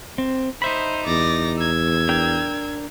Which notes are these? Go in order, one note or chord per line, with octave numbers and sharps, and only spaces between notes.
C4
D#4 C5 E5 B5
E2 D5 A#6
E6 G#6
D4 A#4 G5